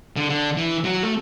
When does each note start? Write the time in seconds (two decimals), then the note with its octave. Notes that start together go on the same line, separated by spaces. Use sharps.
0.16 D3
0.29 D3
0.57 E3
0.84 F#3
1.03 A3